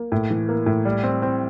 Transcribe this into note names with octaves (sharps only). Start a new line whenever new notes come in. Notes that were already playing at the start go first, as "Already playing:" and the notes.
Already playing: A#3
A2
E3
A#3
A2
G3
C4
C4